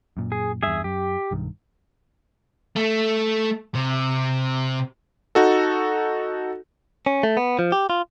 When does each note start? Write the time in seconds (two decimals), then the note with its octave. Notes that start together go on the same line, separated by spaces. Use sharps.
0.17 F#2 A#2
0.32 G#4
0.63 E2 G2 G#4 E5
0.84 F#2 G4
1.31 B1 G2 D#3
2.76 A3
3.75 C3
5.35 D#4 F#4 A4
7.06 C#4
7.23 A3
7.37 B3
7.59 F3
7.72 G4
7.90 F4